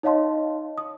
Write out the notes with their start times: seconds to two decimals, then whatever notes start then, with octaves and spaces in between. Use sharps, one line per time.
0.03 D#4 C#5 D#5 F5 A5 C6
0.78 D#6